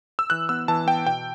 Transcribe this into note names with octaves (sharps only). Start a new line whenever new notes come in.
E6
E3 F#6
B3 E6
E3 A5
B3 G5
B2 G5